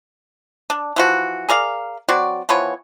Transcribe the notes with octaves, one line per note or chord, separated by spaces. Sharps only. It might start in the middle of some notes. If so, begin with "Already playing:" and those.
D4
E3 F3 F#4
G#4 A#4 D5 F5
F#3 C4 F#4 D5
E3 F3 B3 C#5